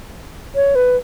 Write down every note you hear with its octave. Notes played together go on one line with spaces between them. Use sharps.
C#5
B4